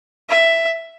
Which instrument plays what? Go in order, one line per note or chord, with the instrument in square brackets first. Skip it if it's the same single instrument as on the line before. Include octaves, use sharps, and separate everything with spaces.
[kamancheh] E5